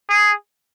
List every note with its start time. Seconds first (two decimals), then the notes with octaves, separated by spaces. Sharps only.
0.09 G#4